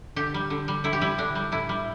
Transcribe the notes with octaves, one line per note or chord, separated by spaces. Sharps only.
D3 G4
G3
D3
G3
D3 E4
G4
G3 E4
D3 D4
G3
A2 E4
G3